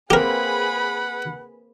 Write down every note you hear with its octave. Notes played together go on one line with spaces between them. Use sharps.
A#3 C4 G4 G#4 A#4 B4 F#5 B5